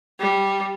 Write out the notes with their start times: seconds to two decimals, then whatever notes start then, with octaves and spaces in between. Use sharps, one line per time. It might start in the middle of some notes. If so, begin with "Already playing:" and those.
0.20 G3